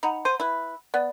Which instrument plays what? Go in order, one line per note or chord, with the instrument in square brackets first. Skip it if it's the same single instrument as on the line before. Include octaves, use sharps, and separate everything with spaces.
[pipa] D#4 [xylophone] F#5 A#5 B5
[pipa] C5 [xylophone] G6 D#7
[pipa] E4 B4
[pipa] B3 [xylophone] D5